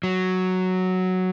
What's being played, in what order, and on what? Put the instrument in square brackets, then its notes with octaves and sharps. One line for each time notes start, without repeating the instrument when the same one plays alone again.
[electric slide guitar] F#3